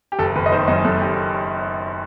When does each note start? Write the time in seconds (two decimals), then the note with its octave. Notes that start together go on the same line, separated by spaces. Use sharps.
0.12 G4
0.19 F#1 A4
0.36 F#1 B4
0.46 D#5
0.52 D#3 C5
0.68 F#2 D#5
0.85 F#2 A4
1.01 G4